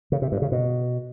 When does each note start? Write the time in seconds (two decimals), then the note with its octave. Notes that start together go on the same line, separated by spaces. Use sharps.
0.12 C#3
0.22 C3
0.32 G2
0.42 C#3
0.52 B2